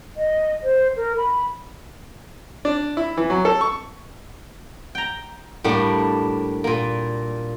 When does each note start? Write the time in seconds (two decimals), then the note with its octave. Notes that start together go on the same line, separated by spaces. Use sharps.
0.17 D#5
0.63 C5
0.96 A#4
1.17 B5
2.65 D4
2.97 E4
3.17 E3
3.30 F#3
3.45 A4
3.61 C#6
4.95 G5 A#5
5.64 A2 G3 A#3 D4
6.64 A#2 A#3